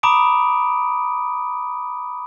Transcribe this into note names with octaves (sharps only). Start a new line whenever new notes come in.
A#5 B5 D6 D#6 D7